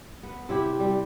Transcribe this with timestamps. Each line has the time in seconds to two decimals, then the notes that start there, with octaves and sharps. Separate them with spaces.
0.23 B3
0.49 C3 E4 G4
0.80 G3